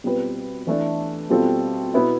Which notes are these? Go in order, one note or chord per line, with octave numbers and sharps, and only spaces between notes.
B2 G3 C4 F4 B4
E3 A3 D4 A4
B2 G3 C4 F4 A4
B2 B3 E4